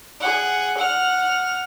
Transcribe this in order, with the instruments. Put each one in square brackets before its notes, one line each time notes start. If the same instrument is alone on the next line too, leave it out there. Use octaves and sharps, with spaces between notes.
[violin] G#4 F#5
F#5 F6